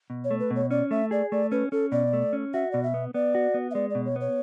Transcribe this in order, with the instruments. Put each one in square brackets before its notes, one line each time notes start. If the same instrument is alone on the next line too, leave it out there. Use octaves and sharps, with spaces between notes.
[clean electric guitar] B2
[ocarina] C#5
[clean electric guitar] A3
[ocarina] B4
[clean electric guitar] B2
[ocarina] C#5
[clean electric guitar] C#4 [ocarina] D5
[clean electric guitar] A3 [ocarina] E5
[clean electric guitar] G#4 [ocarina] D5
[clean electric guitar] A3 [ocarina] D5
[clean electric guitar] C#4 [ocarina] B4
[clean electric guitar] C#4 [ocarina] A4
[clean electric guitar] B2 [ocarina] D5
[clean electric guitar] A3
C#4
[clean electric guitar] F#4 [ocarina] E5
[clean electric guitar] B2 [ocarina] D5
[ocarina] E5
[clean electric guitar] B3
[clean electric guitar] B3 [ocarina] D5
[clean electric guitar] F#4
B3
[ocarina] E5
[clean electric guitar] G#3 [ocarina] D5
[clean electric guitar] B2 [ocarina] D5
[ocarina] C#5
[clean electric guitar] B3 [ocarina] C#5